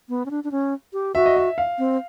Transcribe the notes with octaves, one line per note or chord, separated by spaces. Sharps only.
B3
C#4
D4
D4
C#4
G4
F#4 E5
D#5
E5
F5
C4